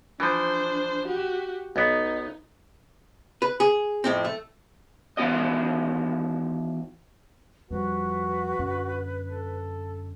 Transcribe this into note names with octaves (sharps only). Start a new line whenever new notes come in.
E3 F3 D4 C5
F#4 G4
B1 B3 D#4
B4
G#4
F2 A2 C4
A3
D#3 E3 B3 F#4 D5 D#5
F2 F3 G3 F#4 B4
F#2 D3
A4